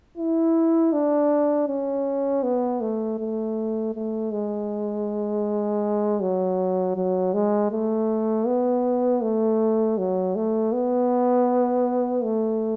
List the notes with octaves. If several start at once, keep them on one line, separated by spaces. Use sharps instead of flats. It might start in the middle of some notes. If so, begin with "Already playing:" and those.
E4
D4
C#4
B3
A3
A3
A3
G#3
F#3
F#3
G#3
A3
B3
A3
F#3
A3
B3
A3